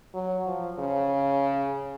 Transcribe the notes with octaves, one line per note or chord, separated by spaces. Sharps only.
F#3
F3
C#3